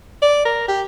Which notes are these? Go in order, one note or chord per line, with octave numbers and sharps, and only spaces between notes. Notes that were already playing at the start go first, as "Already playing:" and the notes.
D5
A#4
G4